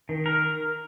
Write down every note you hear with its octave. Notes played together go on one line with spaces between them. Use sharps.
D#3
A#4